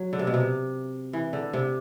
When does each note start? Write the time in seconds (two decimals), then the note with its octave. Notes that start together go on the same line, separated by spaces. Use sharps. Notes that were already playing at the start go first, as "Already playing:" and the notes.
Already playing: F#3
0.13 D3
0.19 C3
0.27 B2
0.34 C3
1.13 E3
1.33 D3
1.53 C3